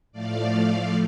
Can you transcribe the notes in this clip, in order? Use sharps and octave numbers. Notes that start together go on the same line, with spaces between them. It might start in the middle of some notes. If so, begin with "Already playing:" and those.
A2 F3 A3 D5 F5